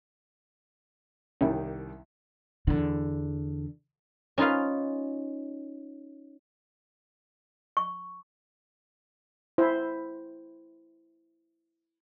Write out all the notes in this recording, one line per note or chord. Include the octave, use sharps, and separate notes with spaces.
C2 D#3 G3 C#4 E4
E2 D3
C#4 D#4 F4 B4 F5
C#6
E4 C5